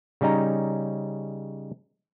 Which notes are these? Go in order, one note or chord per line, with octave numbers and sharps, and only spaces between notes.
C#3 G3 C#4 D#4 A#5